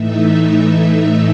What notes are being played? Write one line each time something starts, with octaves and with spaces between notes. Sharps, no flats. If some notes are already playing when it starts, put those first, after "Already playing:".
Already playing: A2 E3 A3 D#4 E5